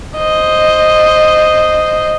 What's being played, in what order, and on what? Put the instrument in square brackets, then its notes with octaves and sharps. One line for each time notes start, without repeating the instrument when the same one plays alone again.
[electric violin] C5 D#5